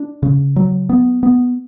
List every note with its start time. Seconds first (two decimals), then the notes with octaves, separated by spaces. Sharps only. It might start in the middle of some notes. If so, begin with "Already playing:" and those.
Already playing: D4
0.23 C#3
0.56 F#3
0.89 B3
1.23 B3